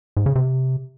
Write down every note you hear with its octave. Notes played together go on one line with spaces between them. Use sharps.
G#2
C#3
C3